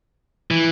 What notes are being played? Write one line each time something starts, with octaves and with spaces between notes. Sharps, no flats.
E3